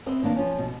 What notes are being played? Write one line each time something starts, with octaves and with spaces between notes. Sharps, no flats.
B3 C4 D#5 E5
D#3 A#3 D4
F3 C#4
B2